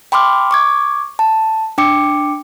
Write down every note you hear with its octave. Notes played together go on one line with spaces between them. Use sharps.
G5 B5 C6 D6 F6
C#6 D6 G#6
A5
D4 G5 D6 C#7